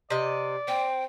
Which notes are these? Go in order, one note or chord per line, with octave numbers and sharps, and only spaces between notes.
C3 D5 D#5
C4 G5